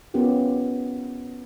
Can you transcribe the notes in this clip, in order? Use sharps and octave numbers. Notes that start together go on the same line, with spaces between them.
B3 C#4 F4 G4 A#4